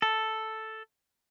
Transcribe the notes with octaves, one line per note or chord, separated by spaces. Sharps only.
A4